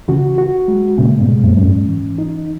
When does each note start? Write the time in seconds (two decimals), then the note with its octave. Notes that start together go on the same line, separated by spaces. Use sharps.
0.08 C#3 E3 F#4
0.38 F#4
0.68 G#3
0.98 A#2 C#3 G#3
1.20 G#2 B2
1.29 G#3
1.44 F#2 A#2
1.57 F#2 C#4
1.65 G#2
1.88 E3
2.18 D#4